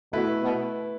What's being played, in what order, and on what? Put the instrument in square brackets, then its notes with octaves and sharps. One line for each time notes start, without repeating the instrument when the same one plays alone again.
[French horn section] B2 [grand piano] A3 E4 B4
[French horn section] B2 B3